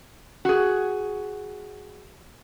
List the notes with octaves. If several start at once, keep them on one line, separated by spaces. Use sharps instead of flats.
F#4 G#4